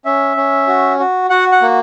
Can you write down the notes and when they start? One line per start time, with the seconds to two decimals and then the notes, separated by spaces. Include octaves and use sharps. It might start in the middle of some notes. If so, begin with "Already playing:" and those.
0.05 C#4 E5
0.37 C#4
0.67 F#4
0.99 F#4
1.30 F#4 F#5
1.52 F#5
1.62 A#3